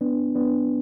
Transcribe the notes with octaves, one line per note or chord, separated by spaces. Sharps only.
B3 D4
B3 D4